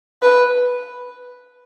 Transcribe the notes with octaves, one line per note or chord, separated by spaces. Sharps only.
B4